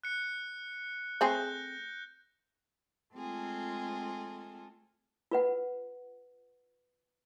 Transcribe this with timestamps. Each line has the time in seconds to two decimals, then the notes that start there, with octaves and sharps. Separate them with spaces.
0.04 F#6 C#7
1.21 A3 C4 G#4 F#6 G6 A#6
3.14 G#3 A3 C4 F4 G#4 A4
5.31 F4 B4 F#5